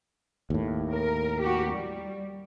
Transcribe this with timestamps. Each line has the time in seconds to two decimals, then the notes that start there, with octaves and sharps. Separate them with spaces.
0.50 D#2 A2
0.91 A#4
1.41 F#4 G4
1.70 G3